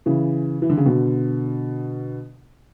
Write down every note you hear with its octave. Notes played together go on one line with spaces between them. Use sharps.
C#3 E3
E3
D3
C#3
B2 D3